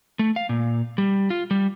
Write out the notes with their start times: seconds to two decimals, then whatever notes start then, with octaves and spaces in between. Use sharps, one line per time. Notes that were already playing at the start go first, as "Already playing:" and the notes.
0.19 A3
0.36 F5
0.49 A#2
0.98 G3
1.30 F4
1.51 G3